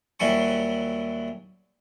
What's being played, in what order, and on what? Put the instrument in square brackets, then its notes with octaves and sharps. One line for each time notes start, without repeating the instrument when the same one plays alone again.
[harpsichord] D#2 F#3 G3 E4 G#5 C#6